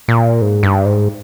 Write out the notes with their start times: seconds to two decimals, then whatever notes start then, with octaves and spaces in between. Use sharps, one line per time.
0.08 A#2
0.42 G#2
0.63 G2
0.85 G#2